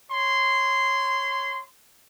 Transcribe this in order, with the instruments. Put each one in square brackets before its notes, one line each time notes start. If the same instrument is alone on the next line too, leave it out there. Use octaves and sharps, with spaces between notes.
[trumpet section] C#5 C6